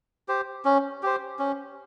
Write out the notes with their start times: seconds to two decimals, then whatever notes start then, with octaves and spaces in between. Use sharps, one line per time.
0.28 G4 C5
0.65 C#4
1.03 G4 C5
1.39 C#4